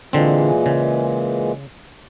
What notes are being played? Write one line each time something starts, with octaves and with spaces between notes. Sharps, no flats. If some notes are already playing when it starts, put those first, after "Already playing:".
A#2 D3 E3 G#3 C4
C#3